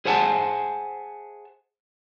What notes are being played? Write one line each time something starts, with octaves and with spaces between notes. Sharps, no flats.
G#4 C5 E5 F#5 G#5 A5